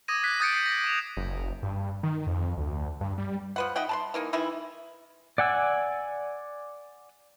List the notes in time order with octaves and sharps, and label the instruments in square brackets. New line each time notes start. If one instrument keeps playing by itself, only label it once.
[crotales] D6 D#6 G#6 A#6 D#7
D#6 F#6 B6
D#6 G6 A6 A#6 C#7 D7
G6 A6 C7 D#7
A6 A#6
D6 E7 F7
[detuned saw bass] F#1
G2
D#3
F2
D2
G2
G3
[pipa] F3 B4 F#5
D#4 E5 F#5 G5
A5 B5 C6
E3 A#3 D#4
D#3 E3 D#4 E4
[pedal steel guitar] D5 F#5 G#5 E6